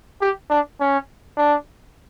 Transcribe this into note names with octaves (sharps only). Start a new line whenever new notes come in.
G4
D4
C#4
D4